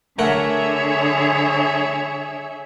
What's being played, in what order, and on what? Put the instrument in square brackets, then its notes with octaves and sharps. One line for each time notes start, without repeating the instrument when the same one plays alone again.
[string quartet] D3 [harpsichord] A3 A#4 F#5 [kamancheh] G#4 E5 [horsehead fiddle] C#5